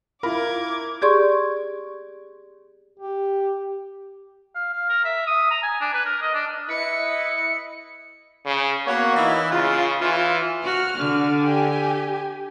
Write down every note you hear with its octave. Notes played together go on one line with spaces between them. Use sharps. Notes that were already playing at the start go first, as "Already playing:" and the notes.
E4 F4 A#4 B5 D6 G#6
G4 G#4 D5 C6 C#6
G4
F5
F5
A#4
E5
D#6
A#5
G#5
D4
B4
A#4
D#5
D4
E4 B4 D#5 C#7
C#3
A#3 B3 F#4 C#5
E3 D#4 E4
C#3 F4
E3 F4
F#4 F6
D3
G4 G#5